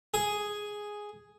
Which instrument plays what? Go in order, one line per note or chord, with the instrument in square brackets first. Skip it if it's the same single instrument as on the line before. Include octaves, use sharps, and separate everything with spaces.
[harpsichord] G#4